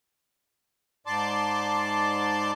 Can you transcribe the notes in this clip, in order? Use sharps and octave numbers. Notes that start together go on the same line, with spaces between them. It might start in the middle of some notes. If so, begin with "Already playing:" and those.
G#2 D5 A5 C6 D6